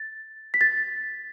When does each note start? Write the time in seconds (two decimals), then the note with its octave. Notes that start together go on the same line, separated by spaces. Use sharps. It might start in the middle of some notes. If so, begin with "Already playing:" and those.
Already playing: A6
0.54 B6
0.61 A6